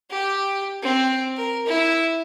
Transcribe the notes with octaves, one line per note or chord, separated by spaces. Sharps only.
G4
C4
A#4
E4